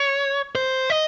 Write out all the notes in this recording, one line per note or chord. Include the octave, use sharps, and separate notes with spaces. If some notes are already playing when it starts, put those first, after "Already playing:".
Already playing: C#5
C5
D#5